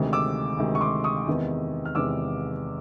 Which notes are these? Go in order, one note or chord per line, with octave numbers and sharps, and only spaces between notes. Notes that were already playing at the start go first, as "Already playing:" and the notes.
Already playing: D2 C3 D#3 G#3
D6 E6
D2 C3 D#3 G#3
C#6
C6 D6
C#6 D#6
E2 C3 D#3 G#3 B3
F6
E2 C3 D#3 G#3 B3 D6 E6